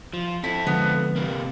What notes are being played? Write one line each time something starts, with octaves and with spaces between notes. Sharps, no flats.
F3
C4 E4 A4
D3 F3 G#3 B3
C3 A#3